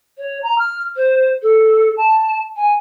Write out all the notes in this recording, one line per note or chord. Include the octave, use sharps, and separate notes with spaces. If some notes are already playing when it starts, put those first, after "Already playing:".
C#5
A#5
F6
C5
A4
A5
G#5